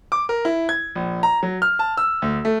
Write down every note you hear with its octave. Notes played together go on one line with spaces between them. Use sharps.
D6
A#4
E4
G#6
A#1
A#5
F#3
F6
A5
E6
D2
A3